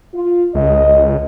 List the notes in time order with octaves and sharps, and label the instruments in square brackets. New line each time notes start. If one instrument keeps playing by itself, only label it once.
[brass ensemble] F4
[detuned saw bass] C#2 [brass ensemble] D#5